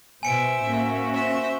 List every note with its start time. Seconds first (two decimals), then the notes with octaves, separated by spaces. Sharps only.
0.23 B2 C5 E5 G#5 C#7 D7
0.62 A2 A#3 C#4 F#4
1.15 C5 E5